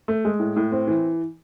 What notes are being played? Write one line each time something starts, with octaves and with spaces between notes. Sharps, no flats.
A3
G#3
A2
A2
C4
E3